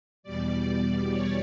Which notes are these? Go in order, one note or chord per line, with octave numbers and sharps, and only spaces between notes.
E2 B2 G3 D5
C#5